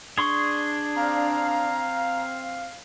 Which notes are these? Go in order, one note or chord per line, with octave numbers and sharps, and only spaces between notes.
D4 G#4 C6 C#6
C4 C5 F5 A#5